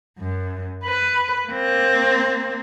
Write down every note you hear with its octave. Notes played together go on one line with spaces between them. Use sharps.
F#2
B4
A#3 C4